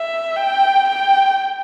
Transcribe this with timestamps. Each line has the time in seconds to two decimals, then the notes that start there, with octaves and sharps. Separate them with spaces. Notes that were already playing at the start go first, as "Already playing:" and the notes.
Already playing: E5
0.37 G5
0.88 G5